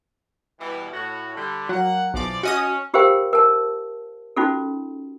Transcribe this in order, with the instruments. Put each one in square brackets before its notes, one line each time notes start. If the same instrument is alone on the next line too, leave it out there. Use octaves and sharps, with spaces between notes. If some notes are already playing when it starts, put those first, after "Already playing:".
[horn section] B2 E3 G3
A2 F#4 C#5
D3 G3
[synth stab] F#3 [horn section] A#3 F#5
[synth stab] B1 D6 [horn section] E3 F3 D5
[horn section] C#4 [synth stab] F#4 D#5 D#6
[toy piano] F4 G4 A#4 C5 F5 G5
A#4 A5
C#4 D#4 F4 F#4 A4